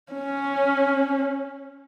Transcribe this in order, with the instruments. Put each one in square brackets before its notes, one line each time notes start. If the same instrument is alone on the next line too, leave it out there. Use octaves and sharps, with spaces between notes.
[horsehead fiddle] C#4